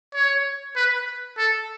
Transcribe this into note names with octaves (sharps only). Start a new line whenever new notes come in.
C#5
B4
A4